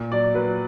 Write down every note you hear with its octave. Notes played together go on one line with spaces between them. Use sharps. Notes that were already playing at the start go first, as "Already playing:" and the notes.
Already playing: A#2
F#3 D5
F#3 B4